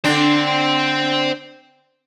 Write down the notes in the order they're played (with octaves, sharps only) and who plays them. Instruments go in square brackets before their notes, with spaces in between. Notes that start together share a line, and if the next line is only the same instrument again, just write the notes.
[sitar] D3 D4 [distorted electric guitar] C5 G5